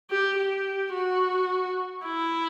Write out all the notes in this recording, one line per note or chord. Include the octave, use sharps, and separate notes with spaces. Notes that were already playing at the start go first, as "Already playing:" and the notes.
G4
G4
F#4
E4